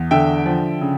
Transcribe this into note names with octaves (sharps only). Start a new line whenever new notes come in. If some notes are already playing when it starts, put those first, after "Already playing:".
Already playing: E2
D3 E5 G5
F3
C#3